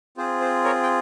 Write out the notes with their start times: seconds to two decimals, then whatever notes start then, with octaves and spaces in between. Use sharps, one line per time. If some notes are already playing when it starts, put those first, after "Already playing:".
0.17 C4 F4 G#4 C5
0.41 C5
0.64 A#4 C#5
0.83 G5